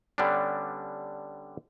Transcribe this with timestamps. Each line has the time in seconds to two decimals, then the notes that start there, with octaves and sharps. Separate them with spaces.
0.18 D3 G3 B3 C#4 D4